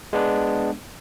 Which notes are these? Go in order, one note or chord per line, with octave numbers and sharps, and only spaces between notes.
G#3 B3 D4